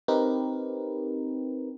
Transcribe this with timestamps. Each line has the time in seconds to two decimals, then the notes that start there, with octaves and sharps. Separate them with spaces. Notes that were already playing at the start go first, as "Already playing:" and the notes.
0.08 C4 D#4 G4 A#4 B4